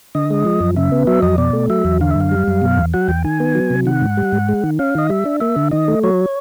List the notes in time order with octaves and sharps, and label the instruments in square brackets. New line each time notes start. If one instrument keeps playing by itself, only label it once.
[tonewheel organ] D3 D#5
G#3
F3
F#2
C#3 E5
B3
F#3 E5
F2 D#5
B2 D5
A3
F#3 E5
E2
D3 F5
E5
F#2 F5
G3
F#2
B2
E2
F#3 F#5
E2 G5
D#3 G#5
B3
F#3
C3
D#3 F#5
G#2
G3
G#2
G#3
D#3
C#4 F5
D#3 D#5
G3 E5
D4
A#3 E5
D3
D#3 D#5
A3
F#3 C#5